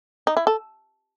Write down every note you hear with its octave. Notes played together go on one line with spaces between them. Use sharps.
D#4
E4
A4